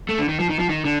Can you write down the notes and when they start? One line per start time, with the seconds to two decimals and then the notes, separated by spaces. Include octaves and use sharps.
0.09 A3
0.19 D3
0.29 D#3
0.40 F3
0.49 D#3
0.59 F3
0.69 D#3
0.85 D3